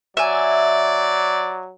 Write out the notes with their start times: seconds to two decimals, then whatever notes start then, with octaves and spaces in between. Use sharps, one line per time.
0.17 F#3 D5 E5 G#5